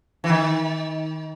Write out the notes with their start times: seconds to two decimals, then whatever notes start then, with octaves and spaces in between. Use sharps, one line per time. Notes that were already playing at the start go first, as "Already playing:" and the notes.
0.24 E3
0.29 D#3